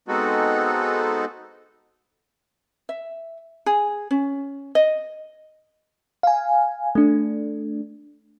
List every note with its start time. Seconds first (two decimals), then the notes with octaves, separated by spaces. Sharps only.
0.08 G#3 B3 C4 D#4 F#4 A4
2.89 E5
3.66 G#4
4.11 C#4
4.75 D#5
6.23 F5 G#5
6.95 A3 D4